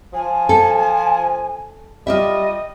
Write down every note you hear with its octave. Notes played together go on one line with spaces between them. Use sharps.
F3 G#5
A4
G3 F4 G4 D#5 E5